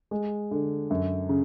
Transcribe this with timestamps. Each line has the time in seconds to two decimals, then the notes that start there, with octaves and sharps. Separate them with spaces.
0.11 G#3
0.51 D3
0.90 F#2
1.29 C#3